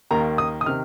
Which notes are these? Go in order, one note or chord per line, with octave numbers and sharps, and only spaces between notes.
D#2 D#3 A#3 A#5
D#6
D#6
C3 D#3 F6